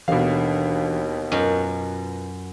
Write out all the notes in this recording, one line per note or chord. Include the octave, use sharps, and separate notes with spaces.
D#2 B2 E3 D4 A4 F5
F#2 F4 B4 D#5